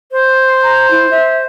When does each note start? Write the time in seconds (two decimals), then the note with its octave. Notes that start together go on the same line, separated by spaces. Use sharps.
0.12 C5
0.63 A#5
0.91 E4
1.11 E5